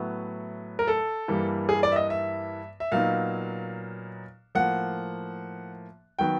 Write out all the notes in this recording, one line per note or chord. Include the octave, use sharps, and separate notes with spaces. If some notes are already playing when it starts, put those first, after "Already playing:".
Already playing: A2 F#3 B3 E4
A#4
A4
G2 E3 G3 A#3
G#4
D5
E5
D#5
E5
E5
A#2 F#3 B3 D#4 F5
A2 F3 A#3 F#5
D#3 F#3 B3 G5